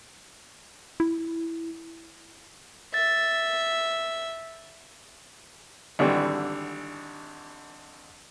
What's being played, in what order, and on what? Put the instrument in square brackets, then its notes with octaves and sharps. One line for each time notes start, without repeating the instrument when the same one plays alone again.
[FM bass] E4
[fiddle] E5 [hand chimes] A6
[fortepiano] G#1 D3 E3 G3